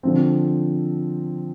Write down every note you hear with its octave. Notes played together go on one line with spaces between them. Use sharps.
D3 F3 C4